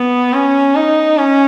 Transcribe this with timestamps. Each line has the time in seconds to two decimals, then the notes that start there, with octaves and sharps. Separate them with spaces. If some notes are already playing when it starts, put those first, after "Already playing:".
Already playing: B3
0.33 C#4
0.76 D#4
1.17 C#4